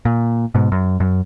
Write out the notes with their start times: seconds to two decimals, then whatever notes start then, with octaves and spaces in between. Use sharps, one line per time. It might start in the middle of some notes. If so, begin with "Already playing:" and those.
0.05 A#2
0.55 G#2 B2
0.72 F#2
1.00 F#2